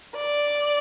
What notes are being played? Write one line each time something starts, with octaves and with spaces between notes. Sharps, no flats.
D5